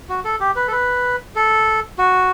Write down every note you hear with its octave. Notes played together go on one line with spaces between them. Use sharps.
F#4
A4
G4
B4
A4
B4
A4
F#4